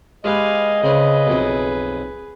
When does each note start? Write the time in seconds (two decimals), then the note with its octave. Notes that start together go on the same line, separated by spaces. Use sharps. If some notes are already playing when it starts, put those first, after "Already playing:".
0.24 G#3 G4 B4 D#5 F5 G#5
0.83 C#3 C4 G#4 B4
1.27 B1 F2 E5